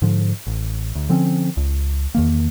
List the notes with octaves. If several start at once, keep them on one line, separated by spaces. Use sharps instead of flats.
G#2 D3 F3
A1
D2
D3 F3 C4 C#4
C#2
E2 D#3 A#3